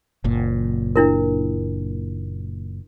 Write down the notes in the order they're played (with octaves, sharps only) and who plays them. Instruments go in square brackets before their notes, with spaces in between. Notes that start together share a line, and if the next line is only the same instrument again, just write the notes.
[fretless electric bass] F#1 A#2
[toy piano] D4 E4 A#4